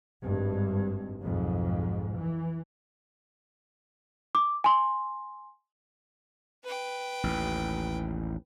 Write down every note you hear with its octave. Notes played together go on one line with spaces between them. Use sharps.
G#1 G2
B1 F2 G#2
E3
D6
G#5 C6
B4 G5
A1 D#2